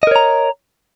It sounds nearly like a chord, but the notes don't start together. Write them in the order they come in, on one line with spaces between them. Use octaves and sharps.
D#5 A#4 C#5 A#5